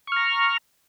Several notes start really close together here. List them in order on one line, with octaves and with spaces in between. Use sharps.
C#6 F6 A#5